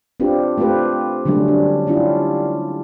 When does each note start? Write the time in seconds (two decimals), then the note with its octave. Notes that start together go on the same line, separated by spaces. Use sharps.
0.20 C4 D4 F4 G4 B4
0.58 A3 C4 F4 G4 B4
1.25 D3 F#3 G3 A3 C#4 D4
1.48 D4
1.87 C#4 D4 E4 F4 G4